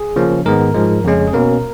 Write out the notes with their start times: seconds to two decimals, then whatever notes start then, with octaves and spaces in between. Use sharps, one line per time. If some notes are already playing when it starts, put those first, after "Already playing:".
Already playing: G#4
0.16 C#3 F3 A#3 C#4
0.46 G#2 D#3 G#3 B3 A#4
0.75 G#2 F3 G#3
1.04 F2 C#3 G#3 C#4
1.28 G#4
1.33 B2 A#3 C#4 A#4